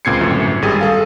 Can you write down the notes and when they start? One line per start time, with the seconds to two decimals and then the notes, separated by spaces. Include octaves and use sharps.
0.05 C#2 A#2 C4 G#6 C7 C#7
0.21 G1 F#2 A2
0.62 G#1 G3 G#4 D#7
0.81 G#4 A4 F5